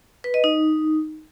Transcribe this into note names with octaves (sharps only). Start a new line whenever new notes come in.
B4
D#5
D#4